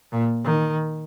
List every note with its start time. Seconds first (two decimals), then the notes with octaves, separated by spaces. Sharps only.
0.12 A#2
0.44 D#3